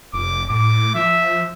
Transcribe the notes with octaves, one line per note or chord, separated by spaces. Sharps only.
F1 D6
A2 D6
F3 E5